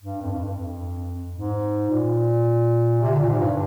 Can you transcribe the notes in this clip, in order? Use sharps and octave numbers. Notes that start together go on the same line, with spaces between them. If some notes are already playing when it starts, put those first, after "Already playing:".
G2
F2
G2
F2
G#2
A#2
C3
D3
A#2
G#2
G2